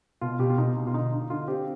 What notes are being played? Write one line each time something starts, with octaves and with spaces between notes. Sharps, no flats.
B2 F4
B2 G4
F4
B2 D#4
B2
F4
D3 D#4
D3
D3 F4
C4 G4